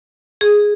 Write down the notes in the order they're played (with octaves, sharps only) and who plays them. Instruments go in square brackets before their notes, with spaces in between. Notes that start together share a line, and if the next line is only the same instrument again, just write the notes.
[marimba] G#4